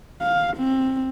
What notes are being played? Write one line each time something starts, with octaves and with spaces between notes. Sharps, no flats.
F5
C4